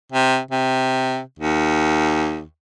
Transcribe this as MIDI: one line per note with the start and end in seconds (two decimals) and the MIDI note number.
0.12 0.39 48
0.51 1.20 48
1.39 2.43 39